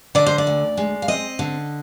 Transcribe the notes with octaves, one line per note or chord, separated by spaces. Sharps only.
D3 D5
C5
D5
D2
G#3
F5
C4 D#5
D3